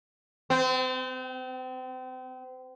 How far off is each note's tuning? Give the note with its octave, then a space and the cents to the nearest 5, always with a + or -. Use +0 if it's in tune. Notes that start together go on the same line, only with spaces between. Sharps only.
C4 -35